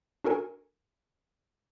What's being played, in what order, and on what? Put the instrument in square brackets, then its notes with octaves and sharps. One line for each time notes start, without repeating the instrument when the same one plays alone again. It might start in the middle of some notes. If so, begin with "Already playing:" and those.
[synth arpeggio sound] D4 F#4 A4 A#4 G#5